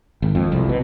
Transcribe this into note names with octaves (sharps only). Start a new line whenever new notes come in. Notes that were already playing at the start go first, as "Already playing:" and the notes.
G#1
F2
C2
B2